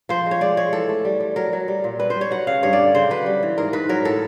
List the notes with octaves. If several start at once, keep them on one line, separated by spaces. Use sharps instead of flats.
F3 C5
G#3
C#5
G#3 D5
G#3 C#5
E3 A4
A3
G3
G3
F#3 A#4
F#3
G3
A#2
G3 B4
C5
G3
C#5
F#3 F#5
C#3 F5
G2 C#5
D5
D3
C#3 C5
F#3 B4
G3
E3
G#2 A#4
G#2 B4
F#3 A#4
A2 A4